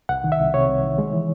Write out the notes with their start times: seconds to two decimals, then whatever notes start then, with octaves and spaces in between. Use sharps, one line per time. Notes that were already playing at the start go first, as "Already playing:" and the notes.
0.09 C2 F#5
0.24 D#3
0.32 E5
0.39 C2
0.54 C3 C#5
0.68 C2
0.83 D#3
0.98 G#3
1.13 E3